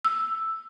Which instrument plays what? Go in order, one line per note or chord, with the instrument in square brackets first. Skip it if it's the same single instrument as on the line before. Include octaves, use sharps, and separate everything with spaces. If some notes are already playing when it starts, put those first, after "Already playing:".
[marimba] E6